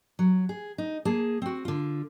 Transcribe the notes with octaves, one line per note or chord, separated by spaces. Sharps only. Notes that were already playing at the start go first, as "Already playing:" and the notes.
F#3
G#4
D#4
A#3 G#4 A5
C4 F#4
D3 F4